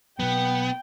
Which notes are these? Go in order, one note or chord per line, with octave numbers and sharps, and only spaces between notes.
B2 F#3 B3 G5